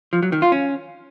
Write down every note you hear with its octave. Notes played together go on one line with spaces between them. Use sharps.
F3
F#3
D#3
F4
C#4